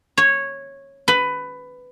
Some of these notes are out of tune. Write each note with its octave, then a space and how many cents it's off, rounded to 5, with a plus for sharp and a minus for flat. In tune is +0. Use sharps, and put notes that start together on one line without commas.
C#5 -10
B4 +15